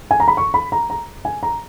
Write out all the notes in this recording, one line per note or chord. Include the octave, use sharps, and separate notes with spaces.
G#5
A#5
B5
C#6
B5
A#5
A#5
G#5
A#5